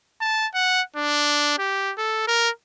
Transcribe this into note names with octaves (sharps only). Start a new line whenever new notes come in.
A5
F#5
D4
G4
A4
A#4